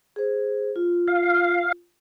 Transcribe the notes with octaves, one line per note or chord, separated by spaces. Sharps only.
G#4 C5
F4
F5